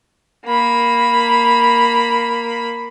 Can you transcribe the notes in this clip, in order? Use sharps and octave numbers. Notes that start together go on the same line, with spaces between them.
A#3 B5